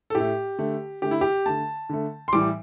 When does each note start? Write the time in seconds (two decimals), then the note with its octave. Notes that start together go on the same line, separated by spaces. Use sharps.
0.10 A4
0.15 A2 A3 G4
0.58 D3 A3
1.02 D3 A3 G4
1.11 E4
1.21 G4
1.46 D3 A3 A5
1.89 D3 A3
2.28 C6
2.33 A2 E3 G3 D6